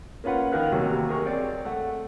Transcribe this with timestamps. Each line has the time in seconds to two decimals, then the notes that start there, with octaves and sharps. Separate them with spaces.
0.24 A#3 C#4 F4 B4 F#5
0.52 D#3 A#4 F5 F#6
0.72 A1 D#2 C3 F#3 F#4
1.09 G#4 A#4 C#6
1.25 C4 C#5 D5
1.65 A3 F#5